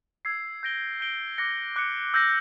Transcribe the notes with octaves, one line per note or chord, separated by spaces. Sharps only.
E6 G#6 C7
G6 A#6 D7 G7
G6 A#6 D7 G7
D6 F#6 A#6 C#7
D6 F#6 A#6 C#7
E6 G6 A#6